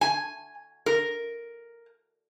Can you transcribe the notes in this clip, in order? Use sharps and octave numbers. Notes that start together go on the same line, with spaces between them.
G#5
A#4